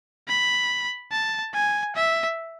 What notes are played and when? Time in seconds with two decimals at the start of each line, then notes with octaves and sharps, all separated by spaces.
0.28 B5
1.11 A5
1.54 G#5
1.96 E5